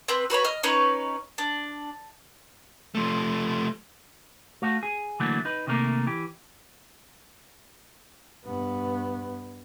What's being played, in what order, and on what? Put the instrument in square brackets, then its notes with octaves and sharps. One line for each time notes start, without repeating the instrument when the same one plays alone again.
[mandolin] C4 B4
F#4 B4 C#5 B5
D#5 F6
C#4 D#4 B4 C#5
D4
[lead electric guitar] F3 A3
[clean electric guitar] A3 F#4 F5
G#4
D3 E3 F#3 A3 A#3
D#4 B4
C3 D#3 A3 A#3 A#4
E3 G4
[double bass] G2 B3